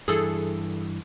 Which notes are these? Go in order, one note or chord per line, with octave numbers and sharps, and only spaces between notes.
G2 E3 G#4 A4